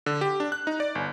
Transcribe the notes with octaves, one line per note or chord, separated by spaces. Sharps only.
D3
G4
D4
F#6
D#4
D5
G1